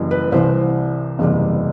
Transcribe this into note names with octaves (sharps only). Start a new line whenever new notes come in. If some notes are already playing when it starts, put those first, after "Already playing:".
Already playing: F#1 F#2 E3 G3
B4
C2 C3 E3 C5
F#1 E2 C3 G3